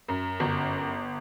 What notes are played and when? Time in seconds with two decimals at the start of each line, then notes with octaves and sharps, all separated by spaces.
0.08 F#2
0.40 G1